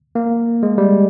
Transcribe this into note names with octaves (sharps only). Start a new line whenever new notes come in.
A#3
G#3
G3